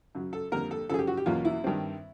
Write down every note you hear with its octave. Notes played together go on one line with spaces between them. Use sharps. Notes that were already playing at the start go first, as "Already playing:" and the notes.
F#2 C#3 F#3
A4
F2 D3 G3 A#3 A#4
A4
F#2 C#3 F3 G#4 A4
G4
F#4
G4
E2 B2 F#3 A#3 C#4 F4
E4
G2 D#3 G3 C4